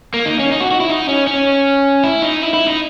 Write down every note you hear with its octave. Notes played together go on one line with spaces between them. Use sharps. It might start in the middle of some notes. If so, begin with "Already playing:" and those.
A#3
D#4
C#4
D#4
F#4
F#4
E4
D#4
C#4
C#4
E4
D#4
E4
E4
D#4